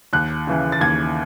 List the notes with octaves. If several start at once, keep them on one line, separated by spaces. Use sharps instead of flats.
D#2 F#6
C#3 E3
A6
D#2 G#6